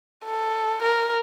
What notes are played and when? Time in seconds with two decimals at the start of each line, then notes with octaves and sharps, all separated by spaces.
0.25 A4
0.83 A#4